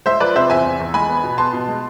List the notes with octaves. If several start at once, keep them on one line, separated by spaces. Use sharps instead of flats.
G#3 C5 E5
F3 B4 D5
C3 C5 E5
E2 E5 G#5
E2
E2
G#3 G#5 B5
B3
B2
B3 A5 C6
B2
G#3